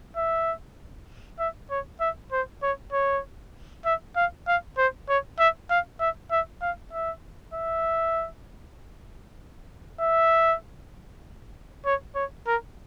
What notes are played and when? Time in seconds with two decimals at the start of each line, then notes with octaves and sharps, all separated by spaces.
0.17 E5
1.39 E5
1.70 C#5
2.00 E5
2.32 C5
2.63 C#5
2.93 C#5
3.85 E5
4.16 F5
4.47 F5
4.78 C5
5.09 C#5
5.39 E5
5.70 F5
6.00 E5
6.31 E5
6.62 F5
6.93 E5
7.54 E5
10.00 E5
11.85 C#5
12.15 C#5
12.47 A#4